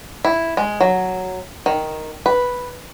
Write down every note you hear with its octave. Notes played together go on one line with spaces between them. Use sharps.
E4
G#3
F#3
D#3
B4